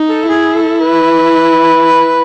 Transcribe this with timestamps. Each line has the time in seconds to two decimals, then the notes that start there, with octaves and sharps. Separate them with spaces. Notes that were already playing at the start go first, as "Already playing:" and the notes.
Already playing: D#4
0.09 A4
0.29 E4 G#4
0.55 A4
0.80 B4